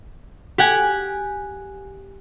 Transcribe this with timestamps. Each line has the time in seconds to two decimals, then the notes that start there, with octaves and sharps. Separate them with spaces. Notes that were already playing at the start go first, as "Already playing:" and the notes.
0.58 G4 F#5 G#5